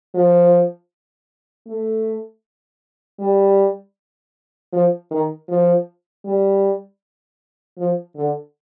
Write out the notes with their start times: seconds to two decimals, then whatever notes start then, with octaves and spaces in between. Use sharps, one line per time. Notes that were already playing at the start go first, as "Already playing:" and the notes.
0.14 F3
1.67 A3
3.20 G3
4.73 F3
5.11 D#3
5.49 F3
6.25 G3
7.78 F3
8.16 D3